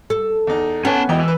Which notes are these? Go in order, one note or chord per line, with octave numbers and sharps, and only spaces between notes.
A4
E2 D#4
B3 C#4 B4 C#5 G#5 A5
E1 E3 D#5 G5
B4 E6